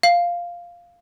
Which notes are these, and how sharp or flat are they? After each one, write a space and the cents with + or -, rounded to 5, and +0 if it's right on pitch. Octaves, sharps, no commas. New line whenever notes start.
F5 -5